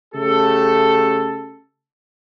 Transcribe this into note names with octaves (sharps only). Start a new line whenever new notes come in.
C#3 A3 G4 A4